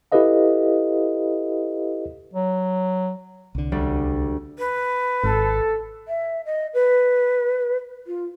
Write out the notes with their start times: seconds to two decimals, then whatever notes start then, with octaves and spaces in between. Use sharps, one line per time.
0.12 E4 G4 A4 B4 D#5 F5
2.33 F#3
3.55 C2 D3
3.72 D2 G3
4.59 B4
5.24 G#1 A4
6.08 E5
6.46 D#5
6.74 B4
8.07 F4